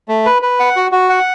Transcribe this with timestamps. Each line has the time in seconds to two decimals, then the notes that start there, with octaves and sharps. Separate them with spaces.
0.08 A3
0.26 B4
0.42 B4
0.60 F#5
0.76 F#4
0.92 F#4
1.09 F#5